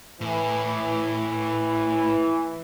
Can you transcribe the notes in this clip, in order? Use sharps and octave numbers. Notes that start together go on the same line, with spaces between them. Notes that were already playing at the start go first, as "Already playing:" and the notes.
A2 E3